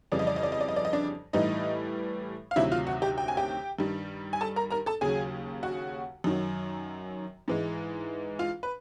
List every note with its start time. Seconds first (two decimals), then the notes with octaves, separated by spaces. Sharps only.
0.12 F2 C#3 E3 G3 D5
0.19 D#5
0.27 D5
0.36 D#5
0.43 D5
0.52 D#5
0.61 D5
0.68 D#5
0.76 D5
0.85 D#5
0.93 D4 D5
1.33 A2 E3 G3 D#4 D#5
2.51 F5
2.56 D2 C3 D#3 F#3 E4 E5
2.72 F4 F5
2.87 F#4 F#5
3.02 G4 G5
3.18 G5
3.28 G#5
3.37 G4 G5
3.79 G2 D#3 G3
4.33 G#5
4.41 A4 A5
4.56 A#4 A#5
4.71 A#4 A#5
4.86 A4 A5
5.01 D#2 C#3 F#3 G#4 G#5
5.63 F#4 F#5
6.24 F#2 D#3 F#3
7.48 G#2 E3 G#3
8.39 F4 F5
8.63 B4